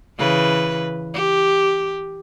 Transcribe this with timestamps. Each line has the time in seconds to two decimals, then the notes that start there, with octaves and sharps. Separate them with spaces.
0.18 C#3 E3 B4
1.14 G4